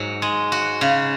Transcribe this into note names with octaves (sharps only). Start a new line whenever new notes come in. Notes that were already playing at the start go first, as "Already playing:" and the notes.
Already playing: G#2 F#3
G#3
F#4
C#3